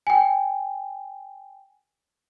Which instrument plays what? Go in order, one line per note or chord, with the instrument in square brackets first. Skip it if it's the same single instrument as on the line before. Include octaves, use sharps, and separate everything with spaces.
[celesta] G5 G#5